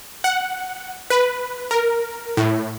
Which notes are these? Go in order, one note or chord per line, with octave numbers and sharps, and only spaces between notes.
F#5
B4
A#4
A2